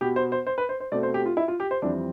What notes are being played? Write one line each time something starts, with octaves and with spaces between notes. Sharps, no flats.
B2 B3 G4
C5
C5
C5
B4
C5
C5
B2 A3 C4 D5
C5
G4
F4
E4
F4
G4
C5
F2 E3 G3 C4 D4